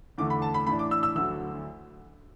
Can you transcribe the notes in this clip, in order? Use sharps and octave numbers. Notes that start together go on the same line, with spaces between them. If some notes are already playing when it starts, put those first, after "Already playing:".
E2 D3 A3 D6
B5
A5
B5
A2 E3 D4 B5
D6
E6
E6
D2 D3 F#3 E6